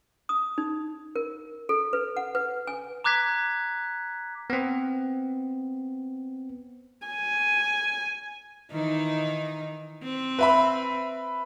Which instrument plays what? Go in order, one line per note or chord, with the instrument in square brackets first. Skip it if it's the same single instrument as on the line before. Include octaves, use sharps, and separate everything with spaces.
[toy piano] D#6
D#4
A#4
A4
B4
F#5
B4
G#5
[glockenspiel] A#5 D6 F#6 G#6 B6
[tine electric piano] B3 C4
[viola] G#5
[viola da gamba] D#3 E3 D#4
C4
[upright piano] B4 E5 B5